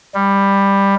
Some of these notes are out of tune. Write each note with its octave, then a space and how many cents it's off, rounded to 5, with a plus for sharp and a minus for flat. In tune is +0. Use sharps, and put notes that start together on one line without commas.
G3 +10